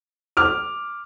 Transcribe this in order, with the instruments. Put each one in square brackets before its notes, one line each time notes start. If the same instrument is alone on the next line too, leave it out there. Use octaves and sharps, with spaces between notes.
[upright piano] D6 F6